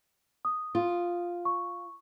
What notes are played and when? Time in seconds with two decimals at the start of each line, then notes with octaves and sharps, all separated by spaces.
0.45 D#6
0.75 F4
1.45 C#6